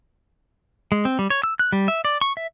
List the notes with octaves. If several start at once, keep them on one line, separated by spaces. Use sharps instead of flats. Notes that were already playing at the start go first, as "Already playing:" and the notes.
G#3
C4
G3
C#5
E6
F#6
G3
E5
D5
C#6
E5